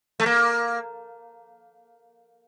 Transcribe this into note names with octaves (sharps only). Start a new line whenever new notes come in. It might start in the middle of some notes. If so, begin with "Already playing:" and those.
A3
A#3